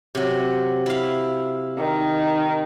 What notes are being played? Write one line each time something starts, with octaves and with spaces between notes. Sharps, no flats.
C3 F#3
E4 F5
D#3